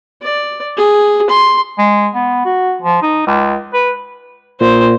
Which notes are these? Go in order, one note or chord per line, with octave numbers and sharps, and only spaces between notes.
D5
G#4
C6
G#3
B3
F#4
F3
D#4
C#2
B4
A#2 C5